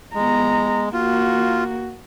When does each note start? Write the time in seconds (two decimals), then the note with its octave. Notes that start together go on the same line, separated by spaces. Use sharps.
0.15 G#3 B3 A#5
0.93 A#3 F4 F#4